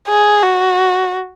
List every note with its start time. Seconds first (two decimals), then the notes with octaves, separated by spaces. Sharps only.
0.09 G#4
0.43 F#4